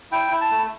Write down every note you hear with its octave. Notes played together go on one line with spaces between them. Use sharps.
E4 G5
E4
A5
A3